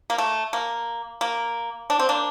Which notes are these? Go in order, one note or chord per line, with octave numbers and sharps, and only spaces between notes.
A#3
A3
A#3
A#3
D4
C4
A#3 D4